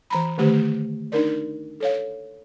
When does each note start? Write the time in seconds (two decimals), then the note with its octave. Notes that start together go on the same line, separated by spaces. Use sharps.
0.10 E3 A#5 B5
0.38 D3 D#3 A3 G4 C5
1.12 D4 D#4 A#4 D5
1.80 A4 C#5 F5